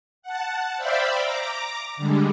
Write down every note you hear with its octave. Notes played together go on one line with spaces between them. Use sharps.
F#5 A5
C5 D5 E5 F5 G5 B5
A#5 D6
D3 G3 G#3